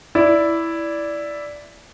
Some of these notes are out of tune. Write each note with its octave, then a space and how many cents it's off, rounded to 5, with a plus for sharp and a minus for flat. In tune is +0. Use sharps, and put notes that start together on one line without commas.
E4 +0 D5 -10